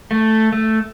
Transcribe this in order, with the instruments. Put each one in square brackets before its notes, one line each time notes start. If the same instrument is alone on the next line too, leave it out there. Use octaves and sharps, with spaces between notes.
[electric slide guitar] A3
A3